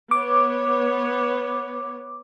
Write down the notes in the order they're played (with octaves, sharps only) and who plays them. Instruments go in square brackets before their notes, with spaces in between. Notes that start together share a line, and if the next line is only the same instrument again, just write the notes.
[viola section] B3 C#5 [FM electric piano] D6